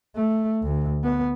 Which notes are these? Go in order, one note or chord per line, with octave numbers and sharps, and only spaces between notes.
A3
D2
B3